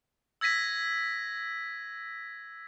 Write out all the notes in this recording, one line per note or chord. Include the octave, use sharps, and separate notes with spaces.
E6 G#6 A#6 B6 D#7